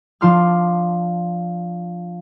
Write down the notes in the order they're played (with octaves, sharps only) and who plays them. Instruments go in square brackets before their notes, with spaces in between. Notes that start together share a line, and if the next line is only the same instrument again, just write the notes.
[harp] F3 D4 F4 C6 D6 F6